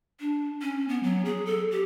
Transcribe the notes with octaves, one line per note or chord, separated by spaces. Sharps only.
D4
C#4
B3
F#3
G#4
A4
G4